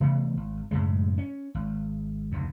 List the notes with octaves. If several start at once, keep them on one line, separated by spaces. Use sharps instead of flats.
C3 E3 A3 B3
G#1
F#2 A2 C#3 G#3
C#4
G#1
F1 D2